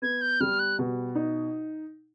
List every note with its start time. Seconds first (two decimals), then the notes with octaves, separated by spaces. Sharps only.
0.02 B3 G#6
0.21 G6
0.40 G3 F6
0.59 F#6
0.79 B2
1.15 D#4